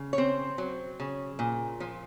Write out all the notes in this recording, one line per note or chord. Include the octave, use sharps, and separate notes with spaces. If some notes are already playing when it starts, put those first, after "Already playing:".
Already playing: C#3
C#5
C4 C5
F#3
C#3
A#2
F3